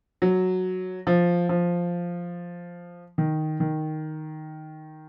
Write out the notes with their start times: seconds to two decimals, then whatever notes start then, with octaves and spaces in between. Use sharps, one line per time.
0.22 F#3
1.07 F3
1.49 F3
3.18 D#3
3.60 D#3